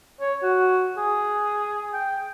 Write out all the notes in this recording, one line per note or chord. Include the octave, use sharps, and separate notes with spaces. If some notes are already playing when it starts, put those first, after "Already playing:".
C#5
F#4
G#4
G5